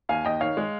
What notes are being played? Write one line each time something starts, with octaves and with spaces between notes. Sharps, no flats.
D#2 F5 G#5
D#2 D#5 G5
D#3 C#5 F5
G#3